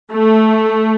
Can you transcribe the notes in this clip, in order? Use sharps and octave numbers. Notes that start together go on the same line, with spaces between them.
A3